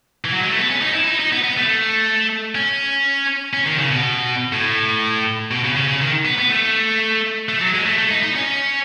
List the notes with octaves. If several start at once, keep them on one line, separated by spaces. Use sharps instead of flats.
E3
F#3
G#3
A3
B3
C#4
D#4
E4
D#4
D#4
B3
B3
A3
C#4
C#4
D#3
C#3
B2
A2
B2
C#3
C#3
C#3
D#3
B3
B3
A3
A3
F#3
G#3
A3
A3
D#4
D#4
C#4